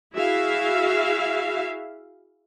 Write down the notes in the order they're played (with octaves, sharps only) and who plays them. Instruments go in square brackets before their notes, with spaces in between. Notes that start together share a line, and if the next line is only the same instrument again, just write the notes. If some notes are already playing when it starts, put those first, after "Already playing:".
[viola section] E4 F#4 G#4 E5 F5